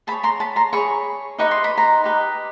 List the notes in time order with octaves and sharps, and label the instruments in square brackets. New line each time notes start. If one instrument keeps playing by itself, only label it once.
[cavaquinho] G#4 A5 B5
C#5
A#5 C6
A5 B5
A#5 C6
G#4 C#5 B5 C#6
D#4 G4 B4 D#5 C#6
C6
B5
A#5 C6
D#4 G4 B4 D#5